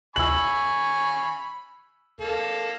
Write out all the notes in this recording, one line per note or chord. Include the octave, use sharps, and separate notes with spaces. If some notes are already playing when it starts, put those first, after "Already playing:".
G#5 B5 C#6 E6 F#7
A#3 A4